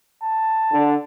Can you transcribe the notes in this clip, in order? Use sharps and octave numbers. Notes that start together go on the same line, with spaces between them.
A5
D3